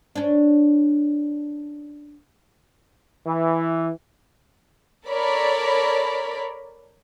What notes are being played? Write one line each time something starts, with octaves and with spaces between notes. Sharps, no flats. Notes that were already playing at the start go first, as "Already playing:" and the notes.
C#4 D4
E3
A4 A#4 C#5 D5 B5